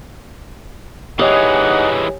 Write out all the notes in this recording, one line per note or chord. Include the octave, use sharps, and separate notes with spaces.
E3 G#3 D#4 G4 G#4 C#5 F#5 G#5